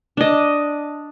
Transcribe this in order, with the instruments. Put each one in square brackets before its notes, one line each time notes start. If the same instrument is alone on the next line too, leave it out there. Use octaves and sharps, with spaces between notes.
[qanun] D4 D#5